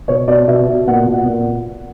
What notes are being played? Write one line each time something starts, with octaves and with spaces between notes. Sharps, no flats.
B2 C#5
B2 D5
B2 E5
B2
A#2 F#5
A#2
F#5
A#2